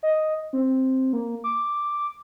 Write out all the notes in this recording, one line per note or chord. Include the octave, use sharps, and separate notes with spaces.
D#5
C4
A#3
D6